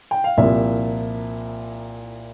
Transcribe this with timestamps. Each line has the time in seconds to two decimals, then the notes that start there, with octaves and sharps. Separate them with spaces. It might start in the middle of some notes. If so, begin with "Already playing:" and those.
0.11 G5
0.24 F5
0.37 C2 A#2 F3 A#3 E4 E5